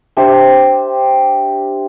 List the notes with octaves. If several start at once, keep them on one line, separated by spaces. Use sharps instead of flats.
D4 G4 C5 E5